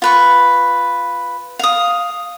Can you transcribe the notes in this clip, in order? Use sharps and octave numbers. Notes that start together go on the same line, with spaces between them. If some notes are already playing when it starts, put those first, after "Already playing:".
F4 B4 C#6
F5 D#6